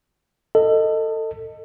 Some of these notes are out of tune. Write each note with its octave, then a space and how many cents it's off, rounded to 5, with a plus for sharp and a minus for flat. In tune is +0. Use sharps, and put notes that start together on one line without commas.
A4 +25 D#5 +0